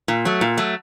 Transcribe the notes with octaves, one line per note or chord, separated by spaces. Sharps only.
A#2
F#3 A3
A#2
F#3 A3